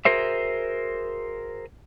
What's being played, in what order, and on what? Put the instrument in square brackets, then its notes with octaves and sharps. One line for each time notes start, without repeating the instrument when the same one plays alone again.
[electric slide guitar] F#4 G#4 A#4 C5 E5